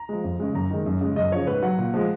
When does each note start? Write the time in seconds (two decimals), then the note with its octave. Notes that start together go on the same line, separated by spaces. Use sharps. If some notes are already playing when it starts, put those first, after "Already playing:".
Already playing: A#5
0.09 F3 G#3
0.24 F2
0.39 C#3 G#3
0.54 F#2 A#5
0.70 D#3 G#3
0.86 F#2
1.01 C#3 G#3
1.16 F#2 D#5
1.32 C#3 F3 C#5
1.47 G#2 B4
1.62 F#3 F#5
1.78 A#2
1.94 F3 G#3